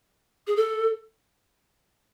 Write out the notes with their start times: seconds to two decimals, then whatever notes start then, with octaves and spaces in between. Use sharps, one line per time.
0.47 G#4
0.56 A4